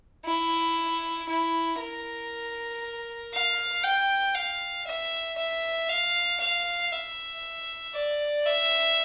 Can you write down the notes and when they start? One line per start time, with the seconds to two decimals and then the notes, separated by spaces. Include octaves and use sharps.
0.25 E4
1.28 E4
1.80 A#4
3.33 F5
3.84 G5
4.35 F5
4.87 E5
5.37 E5
5.89 F5
6.40 F5
6.92 E5
7.94 D5
8.46 E5